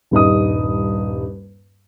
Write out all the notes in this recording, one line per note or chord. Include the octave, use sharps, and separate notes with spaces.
D#1 G2 D#4 D#6